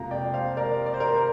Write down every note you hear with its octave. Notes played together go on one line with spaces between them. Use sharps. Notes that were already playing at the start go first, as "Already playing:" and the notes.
Already playing: F2 C3 A#3 F5 A#5
D5 G5
C5 F5
A#4 D5
D5
C5
A#4
C5
A#4